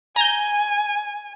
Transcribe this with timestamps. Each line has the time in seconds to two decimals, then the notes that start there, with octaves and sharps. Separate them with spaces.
0.16 G#5 A#5 G6